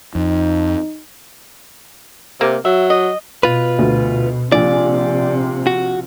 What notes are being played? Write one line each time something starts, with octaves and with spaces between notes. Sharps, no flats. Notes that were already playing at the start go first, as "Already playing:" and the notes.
F2 D#4
C3 A#3
F#3 E5
D#5
B2 F4 B4
D2
A#1 C3 D5 G#5
F#4